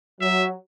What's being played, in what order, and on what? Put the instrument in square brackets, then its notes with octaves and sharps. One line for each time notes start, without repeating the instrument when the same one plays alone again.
[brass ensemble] F#3 [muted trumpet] E5